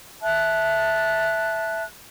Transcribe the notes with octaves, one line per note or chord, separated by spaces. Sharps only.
E5 A5 F#6